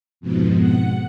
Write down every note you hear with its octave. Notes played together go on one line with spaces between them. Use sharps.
F2 G#2 B2
F#5